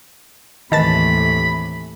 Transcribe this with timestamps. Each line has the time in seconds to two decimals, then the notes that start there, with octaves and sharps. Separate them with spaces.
0.72 D#2 A2 C3 D#3 E3 A5 B5 A6